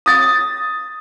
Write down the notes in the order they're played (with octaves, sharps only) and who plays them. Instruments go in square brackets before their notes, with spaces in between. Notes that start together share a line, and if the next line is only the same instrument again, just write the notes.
[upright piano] D#6 A6